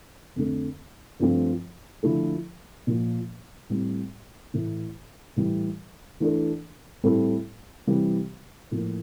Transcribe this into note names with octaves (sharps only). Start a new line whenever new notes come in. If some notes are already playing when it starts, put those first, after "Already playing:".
F2 D3 A3
G2 F3 A3 C4 F4
D3 F3 A3 E4 A4
A#2 F3 A#3
A2 G3 C4
A2 E3 A3 E4
A2 E3 G3
E3 A3 D4 A4
A2 G3 C4 E4 A4
C3 E3 G3 C4 G4
A2 F3 A#3